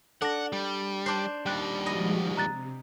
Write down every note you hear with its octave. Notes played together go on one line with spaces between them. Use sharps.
D4 A4 F#5 A#6
G3
D4 C5 C7
D#2 G3 G5 F#6
F3 G#3 F#4 D#5 B5
C3 A#5 F#6 A6